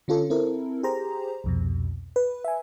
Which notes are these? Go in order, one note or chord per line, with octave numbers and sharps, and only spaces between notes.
D3 C#4 F4 A4
C4 E4 A4 A#4
G4 G#4 C5 A#5
C2 F2 B2
B4
E5 G#5